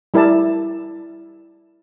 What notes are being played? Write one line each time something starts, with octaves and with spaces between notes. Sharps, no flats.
G3 E4 A#4 D5 A5